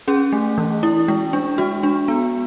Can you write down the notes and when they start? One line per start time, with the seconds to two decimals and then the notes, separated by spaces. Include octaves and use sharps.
0.08 C#4 G#4
0.32 A3
0.58 E3
0.83 E4
1.08 G#3
1.33 D4
1.58 G#3 F#4
1.83 D4
2.08 B3